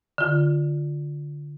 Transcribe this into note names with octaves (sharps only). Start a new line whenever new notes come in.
D3 F4